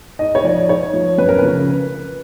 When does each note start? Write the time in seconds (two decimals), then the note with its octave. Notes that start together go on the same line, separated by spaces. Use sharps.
0.19 G#2 D#5
0.35 C#5
0.44 F3 D5
0.68 G#2 C#5
0.94 F3
1.18 F#2 B4
1.29 A#4
1.39 C#3 F3 B4